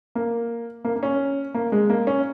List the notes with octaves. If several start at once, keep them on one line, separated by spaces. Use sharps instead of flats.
A#3
A#3
A#3
C#4
A#3
G#3
A#3
C#4